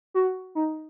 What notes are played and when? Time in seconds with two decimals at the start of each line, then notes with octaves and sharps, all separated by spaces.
0.14 F#4
0.55 D#4